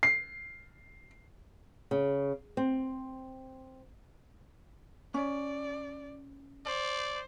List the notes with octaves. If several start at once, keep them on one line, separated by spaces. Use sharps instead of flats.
C7
C#3
C4
C#4 D5
C5 D5